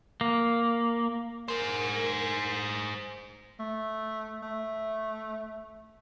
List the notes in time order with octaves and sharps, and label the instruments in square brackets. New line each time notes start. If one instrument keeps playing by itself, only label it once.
[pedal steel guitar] A#3
[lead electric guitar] G#4 C5 [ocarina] A#4
[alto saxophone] A3
A3